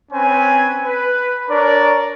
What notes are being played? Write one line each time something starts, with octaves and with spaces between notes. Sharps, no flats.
C4 C#4 B4 G#5
B4
D4 A#4 C#5 D5